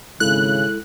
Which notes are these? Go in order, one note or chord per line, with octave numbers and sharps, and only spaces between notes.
G#1 C#3 G#3 E4 A4 F#6